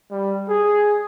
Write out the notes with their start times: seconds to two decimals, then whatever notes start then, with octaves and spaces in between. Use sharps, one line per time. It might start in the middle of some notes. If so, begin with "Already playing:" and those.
0.11 G3
0.49 G#4